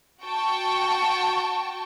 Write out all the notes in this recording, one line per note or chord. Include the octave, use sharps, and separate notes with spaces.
F#4 G5 A5 C#6